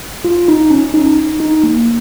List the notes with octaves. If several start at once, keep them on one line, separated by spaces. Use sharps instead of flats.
F4
D#4
C#4
D#4
D#4
D#4
A#3